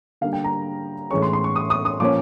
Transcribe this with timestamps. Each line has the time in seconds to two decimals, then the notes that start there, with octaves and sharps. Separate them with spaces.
0.21 D3 G3 A#3 F5
0.33 G5
0.44 A#5
1.11 A2 E3 G#3 C#4 C#6
1.22 C6
1.33 C6
1.44 C#6
1.56 D#6
1.70 D#6
1.85 D#6
2.00 A#2 F3 A#3 C#4 D6